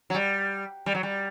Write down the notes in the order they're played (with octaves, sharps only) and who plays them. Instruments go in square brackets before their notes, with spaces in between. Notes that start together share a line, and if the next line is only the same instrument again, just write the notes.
[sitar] F#3
G3
G3
F#3
G3